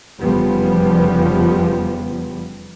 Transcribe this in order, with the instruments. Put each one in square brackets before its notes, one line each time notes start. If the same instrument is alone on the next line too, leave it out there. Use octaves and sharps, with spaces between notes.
[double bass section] F1 E2 C#3 F3 G3 B3